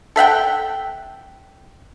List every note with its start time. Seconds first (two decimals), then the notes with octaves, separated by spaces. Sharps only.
0.16 A4 E5 F#5 G5